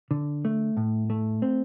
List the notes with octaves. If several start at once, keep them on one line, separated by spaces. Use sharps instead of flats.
D3
A3
A2
A3
C4